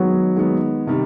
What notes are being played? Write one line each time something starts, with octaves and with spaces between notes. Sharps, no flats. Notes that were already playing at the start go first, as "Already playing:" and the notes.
Already playing: D#3 F#3 G#3 B3
D#3 G#3 B3
C3 D#3 G3